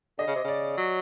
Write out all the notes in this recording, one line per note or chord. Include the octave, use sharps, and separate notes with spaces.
D3 D#5
C#3
C3
C#3 D5
F#3